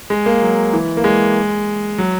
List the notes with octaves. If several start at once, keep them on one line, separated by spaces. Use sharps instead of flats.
G#3
A#3
F#3
E3
A#3
G#3
F#3